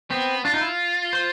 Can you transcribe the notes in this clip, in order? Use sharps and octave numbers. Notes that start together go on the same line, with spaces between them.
B3 C4
D4 F4
D#4
E4
C5